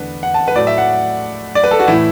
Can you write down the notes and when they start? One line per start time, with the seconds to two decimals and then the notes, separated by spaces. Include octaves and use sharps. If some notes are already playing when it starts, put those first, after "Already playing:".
Already playing: E2 D3 A3 B3 D4 B4
0.23 F#5
0.34 A5
0.48 B4
0.56 A2 F#3 A3 D5
0.67 E5
0.78 F#5
1.55 D5
1.64 B4
1.71 A4
1.80 F#4
1.87 A2 E3 A3 E4